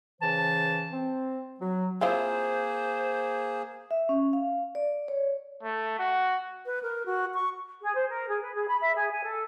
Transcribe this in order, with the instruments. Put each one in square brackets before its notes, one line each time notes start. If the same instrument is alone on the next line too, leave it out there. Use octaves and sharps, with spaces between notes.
[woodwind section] C#3 E3 C5 A5
C4
F#3
[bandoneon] A#3 G#4 [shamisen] C4 E4 F4 [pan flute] C5
[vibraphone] E5
C#4
F5
D5
C#5
[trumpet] A3
F#4
[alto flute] B4
A#4
F#4
C#6
[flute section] G#4
C5
A#4
G#4
B4
G#4
B5
E5
G#4
G#5
A4